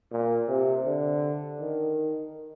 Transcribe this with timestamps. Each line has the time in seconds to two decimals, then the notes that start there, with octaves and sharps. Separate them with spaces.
0.11 A#2
0.48 C3
0.85 D3
1.60 D#3